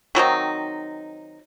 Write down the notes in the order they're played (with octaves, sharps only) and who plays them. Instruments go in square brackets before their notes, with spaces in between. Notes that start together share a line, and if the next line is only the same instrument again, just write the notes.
[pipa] D#3 F#3 C4 D#4